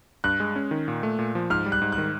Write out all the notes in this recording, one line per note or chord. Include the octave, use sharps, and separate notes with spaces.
G2 F#6
G#3
C#4
D#3
A#2
A3
A#2
F3
G#2 F6
G3
F#6
G#2
F#6
D#3